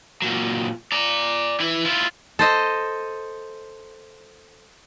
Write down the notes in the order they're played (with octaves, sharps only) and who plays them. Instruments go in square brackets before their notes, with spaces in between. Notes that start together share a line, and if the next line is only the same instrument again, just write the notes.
[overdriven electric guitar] A#2 F#3
D5 A#5
E3 E4
E4 F4
[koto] A4 C5 D#5